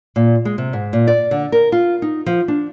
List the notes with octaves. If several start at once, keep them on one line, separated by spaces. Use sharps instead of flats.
A#2
G#3
C3
G#2
A#2
D5
D3
A#4
F4
D#4
F3
D4